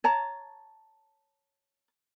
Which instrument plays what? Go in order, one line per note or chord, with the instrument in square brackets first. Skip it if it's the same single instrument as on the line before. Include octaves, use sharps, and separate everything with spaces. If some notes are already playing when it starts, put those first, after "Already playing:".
[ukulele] C#5 A5 A#5